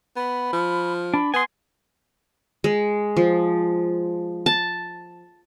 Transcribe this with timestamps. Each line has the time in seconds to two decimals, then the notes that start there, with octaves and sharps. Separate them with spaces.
0.16 B3 B5
0.52 F3
1.14 D4 B5
1.34 B3 G#5 C6 D#6
2.64 G#3
3.17 F3
4.46 A5